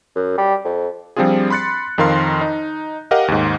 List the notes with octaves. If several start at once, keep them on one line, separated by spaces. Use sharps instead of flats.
F#2
G3
F2
F3 G3 C4 D4 F4 G#4
B5 C6 F#6 A6 C#7
F2 D#3 A#4 F5 C6
D#4
G4 A#4 D#5 F5 F#5
D#2 G#2